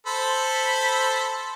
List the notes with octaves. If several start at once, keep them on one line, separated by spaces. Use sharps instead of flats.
A4 C5 B5